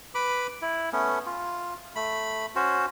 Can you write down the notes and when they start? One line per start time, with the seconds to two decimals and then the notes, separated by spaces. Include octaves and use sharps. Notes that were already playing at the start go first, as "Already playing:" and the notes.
0.15 B4 B5 D6
0.62 E4
0.93 A3 B3 C#4
1.26 F4
1.95 A3 B5
2.56 C#4 F#4 C5